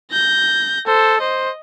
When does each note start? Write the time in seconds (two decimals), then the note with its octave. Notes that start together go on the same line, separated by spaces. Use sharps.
0.11 G6 A#6
0.87 A4 C5
1.20 C5 D#5